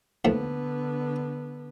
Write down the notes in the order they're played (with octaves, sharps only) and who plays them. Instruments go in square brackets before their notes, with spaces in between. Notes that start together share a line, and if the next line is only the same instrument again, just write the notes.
[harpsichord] D#2 F3 A3 [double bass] D3 B3